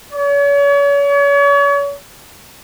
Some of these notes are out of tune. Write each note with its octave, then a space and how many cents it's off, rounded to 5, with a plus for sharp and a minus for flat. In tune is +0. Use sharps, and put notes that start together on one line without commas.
C#5 +40